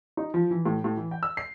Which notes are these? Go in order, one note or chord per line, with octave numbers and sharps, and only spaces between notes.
D#4
F3
E3
A2
A2
E3
G5
E6
C7